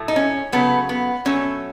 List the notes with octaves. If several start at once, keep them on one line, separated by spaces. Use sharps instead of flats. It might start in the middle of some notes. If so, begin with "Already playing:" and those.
Already playing: A2 F#3 A3
D#4
C#4
C#3 F#3 A3 B3
B3
B2 F#3 A3 C#4